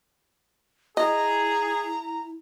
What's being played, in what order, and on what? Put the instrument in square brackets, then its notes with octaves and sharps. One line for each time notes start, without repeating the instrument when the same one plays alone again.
[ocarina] E4 [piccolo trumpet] G#4 [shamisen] D#5 [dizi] A#5